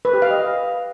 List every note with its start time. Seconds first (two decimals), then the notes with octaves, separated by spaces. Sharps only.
0.05 B4
0.13 G4
0.22 F5
0.31 D#5